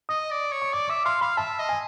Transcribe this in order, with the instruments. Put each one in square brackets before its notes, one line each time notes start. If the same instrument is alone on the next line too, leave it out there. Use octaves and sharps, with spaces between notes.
[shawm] D#5 [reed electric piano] D#6
[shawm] D5
C#5
[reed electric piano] C#6
[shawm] D5 [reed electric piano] D6
[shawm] E5 [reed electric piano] D6
[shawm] F5 [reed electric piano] C6
[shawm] F5 [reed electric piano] B5
[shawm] E5 [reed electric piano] A5
[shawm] D#5
[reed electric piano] G#5